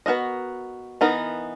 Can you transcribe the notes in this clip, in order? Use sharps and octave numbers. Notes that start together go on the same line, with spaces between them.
B3 F#4 A#4 D#5
E3 B3 D#4 A#4